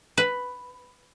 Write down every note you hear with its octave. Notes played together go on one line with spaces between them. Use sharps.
B4